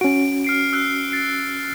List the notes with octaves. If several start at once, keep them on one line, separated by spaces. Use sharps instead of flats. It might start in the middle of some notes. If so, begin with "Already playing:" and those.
C#4 F#4 D7
F6 C7 D7
E6 F#6 C7
A6 C7